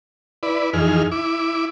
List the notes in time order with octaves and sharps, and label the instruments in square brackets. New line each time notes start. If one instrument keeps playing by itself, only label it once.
[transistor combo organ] E4 B4 D5
F2 E3 D#4 G#4 F6
E4 D6